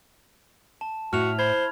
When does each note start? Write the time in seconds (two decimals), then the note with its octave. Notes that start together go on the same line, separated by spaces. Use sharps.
0.81 A5
1.13 A2 F#4 F6 F7
1.39 C5 B5 G#6